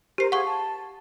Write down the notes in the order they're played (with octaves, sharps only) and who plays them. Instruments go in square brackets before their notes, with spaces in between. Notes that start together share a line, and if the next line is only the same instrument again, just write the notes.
[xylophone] G4 C7 [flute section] A#4 C5
[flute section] F4 G#4 [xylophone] F#5 C#6
[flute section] A5